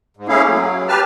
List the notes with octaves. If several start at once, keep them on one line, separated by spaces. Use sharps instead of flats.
G#2
A3 A#3 C#4 E4 G#4 F5
F#3
G4 B4 A5 F6